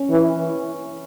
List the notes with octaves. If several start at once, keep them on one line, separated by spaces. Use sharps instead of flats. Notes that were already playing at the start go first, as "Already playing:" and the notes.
Already playing: C#4
E3